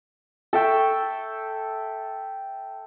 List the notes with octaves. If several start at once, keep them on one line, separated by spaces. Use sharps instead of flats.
A4 E5 G5 C#6